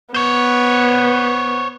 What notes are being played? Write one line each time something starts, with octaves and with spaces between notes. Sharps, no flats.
B3 C5 C#5